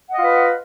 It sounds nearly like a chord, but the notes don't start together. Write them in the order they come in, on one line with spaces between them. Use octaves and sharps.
F#5 D#5 F4 B4